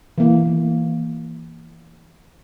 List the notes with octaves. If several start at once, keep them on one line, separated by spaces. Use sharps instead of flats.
E3 A#3